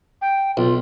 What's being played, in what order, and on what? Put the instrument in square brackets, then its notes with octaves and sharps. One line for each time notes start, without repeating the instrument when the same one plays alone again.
[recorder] G5
[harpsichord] B1 [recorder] F4